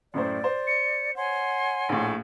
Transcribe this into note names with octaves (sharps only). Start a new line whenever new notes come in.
F#2 A2 C5 D5
C5
C#7
C#5 F#5 G#5 C6
A#1 A2